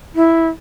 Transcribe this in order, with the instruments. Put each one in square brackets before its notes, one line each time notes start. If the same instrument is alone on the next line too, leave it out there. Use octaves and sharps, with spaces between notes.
[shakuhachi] E4